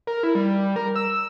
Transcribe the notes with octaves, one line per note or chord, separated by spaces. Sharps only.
A#4
E4
G3
A#4
E6